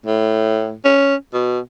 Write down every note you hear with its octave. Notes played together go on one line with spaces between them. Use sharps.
A2
C#4
B2